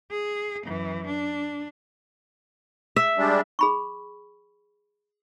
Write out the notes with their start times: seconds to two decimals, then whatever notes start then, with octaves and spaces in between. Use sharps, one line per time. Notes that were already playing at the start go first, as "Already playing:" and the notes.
0.11 G#4
0.66 F#2 E3
1.06 D4
2.96 E5
3.18 G3 G#3 D4
3.59 G#4 B5 C#6